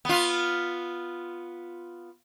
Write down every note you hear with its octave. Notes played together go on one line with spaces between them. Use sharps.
B3 F4